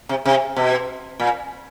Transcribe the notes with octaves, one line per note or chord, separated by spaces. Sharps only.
C3
C3
B2
A#2